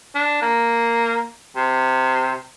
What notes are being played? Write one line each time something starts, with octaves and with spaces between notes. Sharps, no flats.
D4
A#3
C3